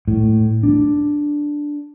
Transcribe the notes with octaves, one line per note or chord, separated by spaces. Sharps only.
A2
D4